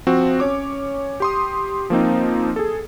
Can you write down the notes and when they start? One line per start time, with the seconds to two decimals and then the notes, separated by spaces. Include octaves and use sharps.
0.07 F3 C4 F#4
0.40 C#4 C#5 D6
1.20 G4 C6 D#6
1.90 F3 A#3 C4 D#4
2.56 G#4 A4